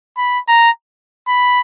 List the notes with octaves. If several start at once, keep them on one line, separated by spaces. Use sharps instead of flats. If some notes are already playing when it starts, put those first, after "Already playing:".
B5
A#5
B5